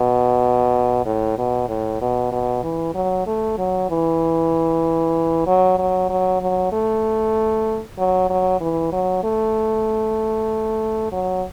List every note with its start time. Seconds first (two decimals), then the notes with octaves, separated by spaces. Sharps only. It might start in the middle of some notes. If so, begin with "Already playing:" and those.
Already playing: B2
1.06 A2
1.38 B2
1.68 A2
2.01 B2
2.32 B2
2.63 E3
2.95 F#3
3.27 A3
3.58 F#3
3.90 E3
5.46 F#3
5.78 F#3
6.09 F#3
6.41 F#3
6.73 A3
7.98 F#3
8.30 F#3
8.60 E3
8.92 F#3
9.24 A3
11.12 F#3